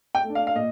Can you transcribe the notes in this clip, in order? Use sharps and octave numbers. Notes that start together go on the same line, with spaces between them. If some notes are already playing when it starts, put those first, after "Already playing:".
G5
A3
D4
F5
F5
A#2 D#5